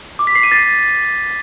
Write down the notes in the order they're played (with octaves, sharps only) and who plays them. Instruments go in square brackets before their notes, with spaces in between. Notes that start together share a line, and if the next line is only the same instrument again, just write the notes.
[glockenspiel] D6
B6
C7
D#7
A6